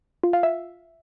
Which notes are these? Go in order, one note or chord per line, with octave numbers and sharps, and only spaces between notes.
F4
F5
E5